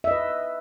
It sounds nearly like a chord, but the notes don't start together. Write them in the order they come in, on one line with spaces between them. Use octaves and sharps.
E5 D#5 B4